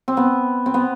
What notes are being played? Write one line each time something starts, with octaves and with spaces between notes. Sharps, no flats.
C4
B3
C4
B3